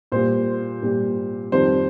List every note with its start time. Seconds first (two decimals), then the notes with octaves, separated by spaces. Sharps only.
0.12 A#2 G3 C5
0.82 A#2 G3
1.52 F2 D#3 G3 C5